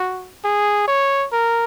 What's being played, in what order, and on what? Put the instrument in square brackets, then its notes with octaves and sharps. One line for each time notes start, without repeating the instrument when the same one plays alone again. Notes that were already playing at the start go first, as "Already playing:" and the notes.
Already playing: [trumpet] F#4
G#4
C#5
A#4